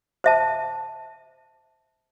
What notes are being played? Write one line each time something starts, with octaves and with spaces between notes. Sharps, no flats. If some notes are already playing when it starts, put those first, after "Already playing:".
C5 E5 A5